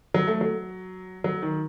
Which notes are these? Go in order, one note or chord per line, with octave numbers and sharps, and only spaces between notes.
F#3
A3
F#3
F#3
D#3